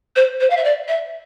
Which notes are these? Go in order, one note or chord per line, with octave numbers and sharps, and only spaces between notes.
C5
C5
F5
E5
D5
E5